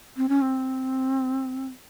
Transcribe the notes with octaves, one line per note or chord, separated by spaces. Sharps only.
C4
C#4
C4